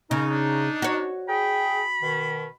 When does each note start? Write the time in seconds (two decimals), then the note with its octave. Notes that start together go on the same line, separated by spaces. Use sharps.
0.11 C#3 D#4 A#4
0.30 D4
0.82 F#4 C#5
1.29 G#4 G5 B5
2.02 B2 D#3